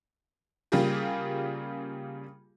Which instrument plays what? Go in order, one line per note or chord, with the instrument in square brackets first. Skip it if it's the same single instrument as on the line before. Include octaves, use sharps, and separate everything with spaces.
[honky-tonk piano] C#3 G3 A#3 F4 G4 G#4